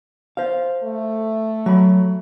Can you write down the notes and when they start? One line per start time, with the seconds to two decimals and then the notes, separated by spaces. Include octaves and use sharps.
0.37 C5 F5
0.83 A3
1.66 F#3 B5